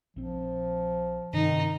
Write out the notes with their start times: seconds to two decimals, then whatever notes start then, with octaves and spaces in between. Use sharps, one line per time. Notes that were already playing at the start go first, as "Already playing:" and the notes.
0.16 A#1 F3 C4
1.33 G2 C3 D#3 D#4